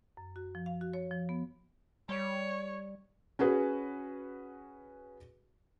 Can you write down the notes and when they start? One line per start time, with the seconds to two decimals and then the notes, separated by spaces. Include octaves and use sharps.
0.17 F#2
0.36 F#4
0.55 F3
0.66 F5
0.81 F#4
0.93 C#5
1.11 F3
1.29 B3
2.09 G3 C#5
3.39 C#4 F#4 G#4 B4 C#5